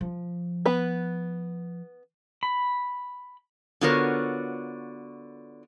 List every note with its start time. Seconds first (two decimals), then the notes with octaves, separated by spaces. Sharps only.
0.01 F3
0.66 B3 B4
2.43 B5
3.81 D3 B3 F4 F#4 A#4 C#5